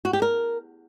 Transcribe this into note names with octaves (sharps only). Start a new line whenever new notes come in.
F#4
G4
A#4